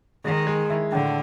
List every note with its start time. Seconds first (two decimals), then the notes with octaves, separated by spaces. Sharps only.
0.25 D#3 G#3
0.47 G#3
0.70 E4
0.92 A2 D3